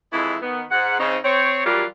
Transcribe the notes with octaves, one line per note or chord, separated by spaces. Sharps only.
F2 E3 G#3 E4
D#3 B3
G#2 F#5
C#3 C4 D#4
C4 C#5
E3 F#3 G3 F4 G4 A#4